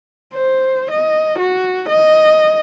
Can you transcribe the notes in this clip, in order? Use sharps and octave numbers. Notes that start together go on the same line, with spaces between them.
C5
D#5
F#4
D#5